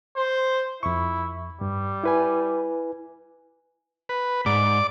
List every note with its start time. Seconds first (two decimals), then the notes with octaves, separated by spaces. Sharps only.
0.17 C5
0.83 F2 E4 C#6
1.61 G2 G3
2.04 E4 B4 G#5
4.09 B4
4.46 G#2 D5 D6